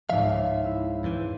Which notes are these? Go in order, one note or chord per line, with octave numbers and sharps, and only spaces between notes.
C#2 G#2 F3 E5 F5
E4
F2 E3 C5